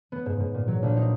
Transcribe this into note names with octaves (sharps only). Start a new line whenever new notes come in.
B3
G#2
G#2
A#2
F#3
A#1
D#4